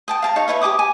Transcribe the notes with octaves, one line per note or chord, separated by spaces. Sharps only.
G5 A5 D#6
F5 A5 A#5
D#4 C#5 F5
E4 B4 C#5 E5
G4 G#5 D6 D#6
G#5